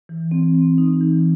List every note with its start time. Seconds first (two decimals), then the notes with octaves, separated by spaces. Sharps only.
0.09 E3
0.31 C4
0.55 C4
0.78 D#4
1.01 E3